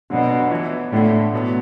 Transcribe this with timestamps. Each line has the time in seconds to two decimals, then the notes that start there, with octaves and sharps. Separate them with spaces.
0.10 B2 D3 F#3 D4
0.50 E3 B3 E4
0.92 A2 D3 A3 D4
1.33 B2 F#3 B3